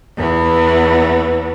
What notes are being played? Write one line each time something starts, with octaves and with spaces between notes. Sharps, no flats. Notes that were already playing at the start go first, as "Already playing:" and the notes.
E2 E3 B3